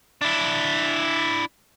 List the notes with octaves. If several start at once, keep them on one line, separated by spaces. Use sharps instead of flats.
D4 E4